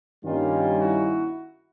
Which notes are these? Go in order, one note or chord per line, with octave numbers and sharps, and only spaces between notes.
G2 D#3 G3 A#3 C#4 D#4 F4
E4 F#4